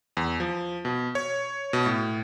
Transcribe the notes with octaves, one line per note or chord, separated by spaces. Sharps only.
E2
F3
B2
C#5
B2
A2